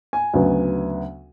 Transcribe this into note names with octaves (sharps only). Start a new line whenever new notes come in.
G#5
D2 C#3 F#3 B3